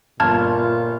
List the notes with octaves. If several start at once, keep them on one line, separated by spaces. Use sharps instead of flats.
G1 A#2 F4 A5 F6 G#6